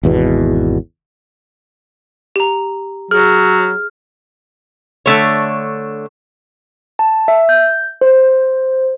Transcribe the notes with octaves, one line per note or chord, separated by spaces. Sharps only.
G#1 E2 B2
G4 A#5
F#3 G#4 F6
D3 A3 C#5
A5
E5
G6
C5